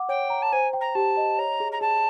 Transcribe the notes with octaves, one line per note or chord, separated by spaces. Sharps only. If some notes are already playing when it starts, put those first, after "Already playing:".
Already playing: F#5 D6
C#5 G5
A#5
A5
C5 G#5
G5
A#5
G4 A5
D#5
C#5 A#5
G#4
A#5
G#4 A5